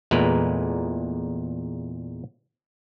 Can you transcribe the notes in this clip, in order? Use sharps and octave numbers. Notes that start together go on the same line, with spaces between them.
E2 A#2 G#3 A3 A#4 B4